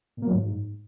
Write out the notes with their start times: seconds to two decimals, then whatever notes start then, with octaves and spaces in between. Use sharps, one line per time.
0.17 A#2
0.22 A#3
0.27 F#3
0.32 G#2